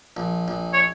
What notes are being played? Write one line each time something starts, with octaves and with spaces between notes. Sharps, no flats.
A#1
A#1
C#5